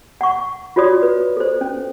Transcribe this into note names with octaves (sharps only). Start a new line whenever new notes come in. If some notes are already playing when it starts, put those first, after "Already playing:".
F#5 C#6
F4 F#4 C#5 D5 D#6
B4
A4 C5
C#4